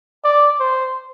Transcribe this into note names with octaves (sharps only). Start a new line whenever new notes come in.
D5
C5